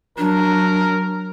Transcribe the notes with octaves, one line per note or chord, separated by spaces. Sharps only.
F#3 D4 A#4